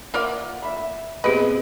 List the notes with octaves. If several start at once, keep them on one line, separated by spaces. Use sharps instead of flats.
A#3 F4 D5 E5 F#5
E5 B5
E5
A#2 B3 C4 G4 G#4 B4 D#5